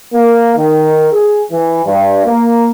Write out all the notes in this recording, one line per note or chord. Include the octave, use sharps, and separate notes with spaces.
A#3
D#3
G#4
E3
G2
A#3